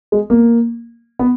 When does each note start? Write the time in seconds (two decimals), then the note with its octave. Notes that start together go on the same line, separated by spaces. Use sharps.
0.12 G#3
0.30 A#3
1.19 B3